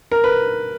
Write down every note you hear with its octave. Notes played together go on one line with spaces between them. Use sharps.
A#4
B4